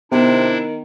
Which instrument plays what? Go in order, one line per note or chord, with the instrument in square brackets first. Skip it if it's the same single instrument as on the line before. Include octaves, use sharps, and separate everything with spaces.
[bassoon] C3 [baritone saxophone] D#3 [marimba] B3 [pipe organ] D4 E4